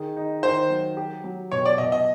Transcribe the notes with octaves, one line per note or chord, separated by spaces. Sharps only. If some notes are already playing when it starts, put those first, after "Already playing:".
Already playing: D#3 G#4
D#4
D#3 C5
F#3
G4
F#3
B2 C#5
D5
B2 D#5
D#5